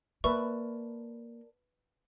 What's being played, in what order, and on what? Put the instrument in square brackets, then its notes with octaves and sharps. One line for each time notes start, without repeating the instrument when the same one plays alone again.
[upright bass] A#3 [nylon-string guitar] A#4 D5 A5 [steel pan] B4 E5 [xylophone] C#6